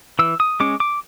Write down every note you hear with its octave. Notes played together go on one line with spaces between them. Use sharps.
E3 E6
D#6
G#3 C#4 D6
D6